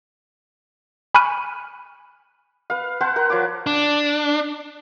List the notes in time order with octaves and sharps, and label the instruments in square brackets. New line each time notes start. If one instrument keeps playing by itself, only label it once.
[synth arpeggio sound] G#5 B5 C#6 F6 F#6 D#7
[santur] B4 F5
B4 C5 F#5 A5
A#4 F#5
F3 B4 C#5 D6
[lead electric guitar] D4